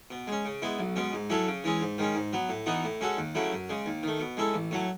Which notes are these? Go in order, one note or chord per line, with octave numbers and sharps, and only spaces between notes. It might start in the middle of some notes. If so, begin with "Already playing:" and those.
B2
G#3 C#4
C#3
G#3 B3 E4
B1
B2 G#3 C#4
G#2
F#3 C#4 E4 A4
C#3
E3 G#3 C#4 G#4
G#2
D#3 G#3 C#4
G#2
F#3 B3
A2
E3 B3 D#4 F#4
A2
G#3 C#4 F#4 A4
D#2
C#3 F#3 A3 E4
F#2
C#3 G#3
D#2
D#3 A3
B2
G#3 C#4 E4 A4
A1
A2 F#3 A3